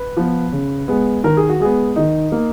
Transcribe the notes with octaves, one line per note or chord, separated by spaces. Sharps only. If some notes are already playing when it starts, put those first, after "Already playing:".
Already playing: B4
F3 B3
C#3
G#3 B3
D#3 A#4
G#4
F#4
G#3 B3 G#4
D#3 D#4
A#3